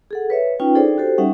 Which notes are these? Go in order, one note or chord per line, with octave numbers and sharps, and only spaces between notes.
G#4 A4 F#5
B4 C#5 E5
C#4 D#4 F4 B4 G5
D4 D#4 G#4 A4 C5 D5
F#4 G4 A4 C5
G3 C#4 D#4 E5 F#5